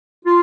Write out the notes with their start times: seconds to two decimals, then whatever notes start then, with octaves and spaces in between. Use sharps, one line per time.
0.25 F4